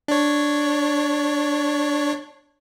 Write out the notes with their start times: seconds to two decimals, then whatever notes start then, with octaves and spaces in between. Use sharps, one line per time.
0.08 D4 C#5